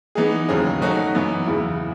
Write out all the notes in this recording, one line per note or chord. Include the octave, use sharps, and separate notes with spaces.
E3 B3 D#4 G#4
D#2 C#3 F#3 C#4 G#4
B2 F#3 A3 D#4 F#4
F#2 E3 B3
E2 C#3 E3 B3 E4